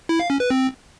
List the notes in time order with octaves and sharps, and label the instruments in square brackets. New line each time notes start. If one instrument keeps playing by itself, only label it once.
[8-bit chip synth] E4
F5
C#4
B4
C4